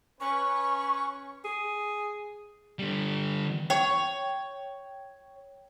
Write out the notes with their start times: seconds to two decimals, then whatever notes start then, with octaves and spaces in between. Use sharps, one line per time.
0.20 C#4 B4 C#6
1.45 G#4
2.79 D3 G3
3.70 C#5 G5